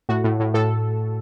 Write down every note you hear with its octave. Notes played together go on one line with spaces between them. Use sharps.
A2 F#4
A2
A2
A2 A4